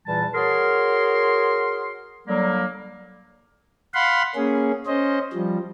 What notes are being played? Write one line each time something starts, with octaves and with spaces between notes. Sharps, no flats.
E2 A#2 E3 G3 A5
F#4 G#4 A#4 C#5 C6
D3 F#3 G3 A#3
F5 F#5 B5 C6
A#3 C#4 G#4
C#4 C5 D#5
F3 G3